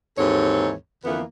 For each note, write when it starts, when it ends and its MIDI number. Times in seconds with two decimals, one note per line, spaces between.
0.18 0.73 39
0.18 0.73 44
0.18 0.73 52
0.18 0.73 60
0.18 0.73 69
0.18 0.73 73
1.04 1.22 41
1.04 1.22 50
1.04 1.22 52
1.04 1.22 58
1.04 1.22 59